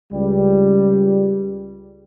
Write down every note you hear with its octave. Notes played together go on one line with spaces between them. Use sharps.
C#2 G3